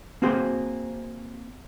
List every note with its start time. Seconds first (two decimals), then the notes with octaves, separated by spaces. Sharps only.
0.22 A#3 C4 F#4 G#4 C5